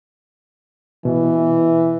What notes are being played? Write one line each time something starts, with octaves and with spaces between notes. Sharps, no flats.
B2 E3